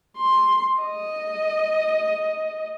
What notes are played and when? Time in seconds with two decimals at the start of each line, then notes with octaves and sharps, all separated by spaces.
0.17 C6
0.82 D#5